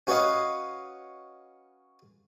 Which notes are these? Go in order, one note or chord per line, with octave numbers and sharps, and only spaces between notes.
C#4 F#4 B4 C#5 D#5 F5